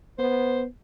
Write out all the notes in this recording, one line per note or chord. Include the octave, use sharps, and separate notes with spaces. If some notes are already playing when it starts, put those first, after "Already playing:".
B3 C5